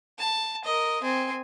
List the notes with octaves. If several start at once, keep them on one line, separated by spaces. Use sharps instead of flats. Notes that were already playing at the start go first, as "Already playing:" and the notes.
A5
A#4 D#5
C4 G#5